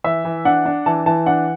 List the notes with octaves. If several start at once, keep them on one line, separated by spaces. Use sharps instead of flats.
E3 E5
E3
D4 F#5
D4
E3 A5
E3 A5
D4 F#5